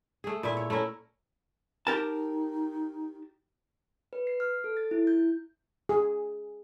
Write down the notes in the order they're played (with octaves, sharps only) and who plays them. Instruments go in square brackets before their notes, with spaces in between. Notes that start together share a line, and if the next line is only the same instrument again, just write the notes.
[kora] A3 G#4
A#2 A3 E4 E5
C#5
A3 C#4 E4 A#4
[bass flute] D#4 [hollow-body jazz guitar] G4 A#4 A5
[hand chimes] B4
C7
F6
A4
A6
E4
G6
[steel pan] G#4